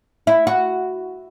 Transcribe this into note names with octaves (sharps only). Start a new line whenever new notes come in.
E4
F#4